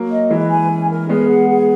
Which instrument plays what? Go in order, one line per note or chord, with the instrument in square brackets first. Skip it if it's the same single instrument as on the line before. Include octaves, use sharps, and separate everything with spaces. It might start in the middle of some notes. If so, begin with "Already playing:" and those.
Already playing: [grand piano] F#3 A#3
[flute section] D#5
[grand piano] E3 G#3 [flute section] B4
[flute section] G#5
C#4
A#4
[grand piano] G#3 B3 [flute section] G#4
[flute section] F#5
G#4